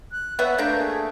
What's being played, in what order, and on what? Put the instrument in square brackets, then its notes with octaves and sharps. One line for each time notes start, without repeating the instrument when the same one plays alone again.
[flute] F#6
[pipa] B3 C#5 F#5 [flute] B4 [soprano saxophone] E5
[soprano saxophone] A3 [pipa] A#3 D4 [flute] G6
[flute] G#4